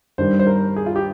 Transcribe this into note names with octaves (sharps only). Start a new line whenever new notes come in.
G2 D#3 G3 C5
C5
A#4
G#4
F4
G4